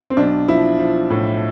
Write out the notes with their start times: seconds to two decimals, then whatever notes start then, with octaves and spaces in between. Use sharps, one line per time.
0.10 C4
0.17 B1 D4
0.48 F3 E4
0.79 F3
1.10 A2